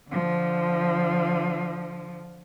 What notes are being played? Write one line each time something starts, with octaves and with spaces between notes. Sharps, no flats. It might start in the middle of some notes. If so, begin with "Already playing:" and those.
D3 F3